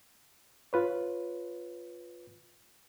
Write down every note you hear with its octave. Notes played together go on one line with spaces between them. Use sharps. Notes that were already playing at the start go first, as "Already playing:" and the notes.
F4 B4 C#5